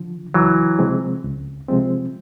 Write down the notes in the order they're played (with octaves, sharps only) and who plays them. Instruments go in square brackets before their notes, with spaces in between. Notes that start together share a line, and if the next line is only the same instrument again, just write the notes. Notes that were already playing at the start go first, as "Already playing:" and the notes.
Already playing: [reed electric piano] D3 F3
[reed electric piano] C#2 [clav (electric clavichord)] E3 F#3
[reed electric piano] C3 F3 G#3 C4
C#2
C3 F3 G#3 C4